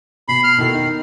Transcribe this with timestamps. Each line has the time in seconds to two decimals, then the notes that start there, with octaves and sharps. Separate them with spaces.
0.28 B2 B5 C7
0.44 F6
0.58 B2 D#3 E4 A4
0.74 D#4